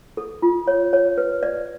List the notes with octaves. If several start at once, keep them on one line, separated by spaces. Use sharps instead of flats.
A4
F4
C#5
C#5
B4
D5